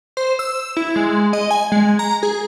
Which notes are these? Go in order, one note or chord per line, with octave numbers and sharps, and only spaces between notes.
C5
E6
E4
G#3
D#5
G#5
G#3
A#5
G#4